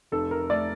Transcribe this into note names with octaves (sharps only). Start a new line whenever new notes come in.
F1 A4
A#4
A3 D5